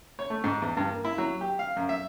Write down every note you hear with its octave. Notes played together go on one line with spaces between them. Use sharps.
C#5
A3
G#2
E2
G2
A#3
E4
F#3
G4
F5
F#2
E5